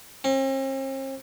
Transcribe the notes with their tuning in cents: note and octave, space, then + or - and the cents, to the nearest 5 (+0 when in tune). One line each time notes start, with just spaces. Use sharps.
C4 +45